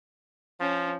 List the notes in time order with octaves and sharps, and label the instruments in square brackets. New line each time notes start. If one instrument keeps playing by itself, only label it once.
[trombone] F3 [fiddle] C#4